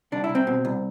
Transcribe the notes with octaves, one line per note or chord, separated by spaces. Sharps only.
C2 D4
E4
C2
C4
B2
C2